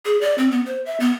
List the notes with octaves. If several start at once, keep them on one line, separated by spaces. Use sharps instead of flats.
G#4
D5
C4
B3
C5
E5
B3